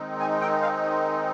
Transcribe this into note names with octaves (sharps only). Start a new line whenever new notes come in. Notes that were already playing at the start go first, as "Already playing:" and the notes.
Already playing: D#3 G#3 C4 D#4
G#5
G5
F5